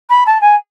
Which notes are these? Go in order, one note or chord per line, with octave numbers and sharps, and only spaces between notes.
B5
A5
G#5